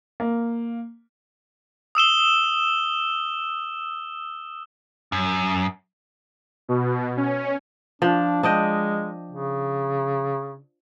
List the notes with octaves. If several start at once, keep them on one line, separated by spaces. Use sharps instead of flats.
A#3
D#6 E6 E7 G7
F#2
B2
C#4
F3 D4
G#3 D4 D#5 G5
C#3